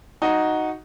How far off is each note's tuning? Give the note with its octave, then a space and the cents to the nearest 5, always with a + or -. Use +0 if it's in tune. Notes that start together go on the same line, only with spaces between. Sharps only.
D#4 +0 F#4 +0